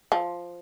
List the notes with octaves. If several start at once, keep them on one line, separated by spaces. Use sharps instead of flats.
F3